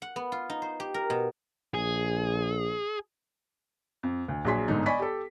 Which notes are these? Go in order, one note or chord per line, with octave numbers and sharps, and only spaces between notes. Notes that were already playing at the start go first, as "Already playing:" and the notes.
F#5
B3
F4
D#4
C5
G4
A#4
B2
A#1 G#4
F2
D2
A#1 F#3 G#4 G#5 C6 B6
G1 G#2 D3 G#3 D#4
D5 D#5 G#5 B5 C#6 B6
G4 A4